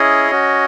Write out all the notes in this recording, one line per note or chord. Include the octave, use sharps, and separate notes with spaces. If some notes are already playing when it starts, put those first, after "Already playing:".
Already playing: C#4 E4 G#4 C#5 D#5
C#4 F#4